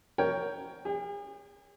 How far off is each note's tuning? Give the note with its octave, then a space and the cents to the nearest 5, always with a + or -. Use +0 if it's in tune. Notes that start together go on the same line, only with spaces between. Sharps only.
A#4 +0 C#5 +15 G5 +0
G#4 -40 G5 +20